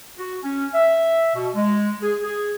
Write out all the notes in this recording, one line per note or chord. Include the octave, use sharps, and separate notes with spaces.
F#4
C#4
E5
B2
G#3
G#4
G#4